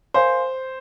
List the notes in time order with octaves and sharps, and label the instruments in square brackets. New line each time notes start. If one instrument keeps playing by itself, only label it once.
[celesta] A#4 F5 G#5 C6 [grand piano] C5